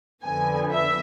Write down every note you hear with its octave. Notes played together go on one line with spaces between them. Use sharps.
F2 D3 F3 B3 G#5
E5